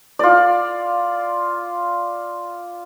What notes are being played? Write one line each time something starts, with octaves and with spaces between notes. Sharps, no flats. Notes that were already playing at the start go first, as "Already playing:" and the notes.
F4 D5